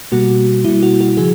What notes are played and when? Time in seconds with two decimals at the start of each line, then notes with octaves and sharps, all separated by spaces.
0.12 B2 G3 A#3 F#4
0.65 B2 G3 A#3 E4
0.83 F#4
1.01 F#4
1.17 C#3 F3 G#4